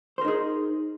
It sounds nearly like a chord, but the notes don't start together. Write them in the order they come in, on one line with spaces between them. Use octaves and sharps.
C5 A#4 D#4 G#4